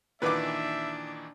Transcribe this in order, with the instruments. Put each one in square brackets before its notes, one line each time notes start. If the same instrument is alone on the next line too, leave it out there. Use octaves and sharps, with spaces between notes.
[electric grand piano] A#2 D#3 E3 [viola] D4 [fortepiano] B4 D6 [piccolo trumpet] E5